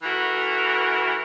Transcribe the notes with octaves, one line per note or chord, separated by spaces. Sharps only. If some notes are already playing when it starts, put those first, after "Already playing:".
E3 A3 F#4 A#4